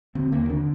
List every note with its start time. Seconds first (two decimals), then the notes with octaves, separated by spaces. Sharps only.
0.15 D3 C4
0.32 D#2 A#3
0.50 D3 D4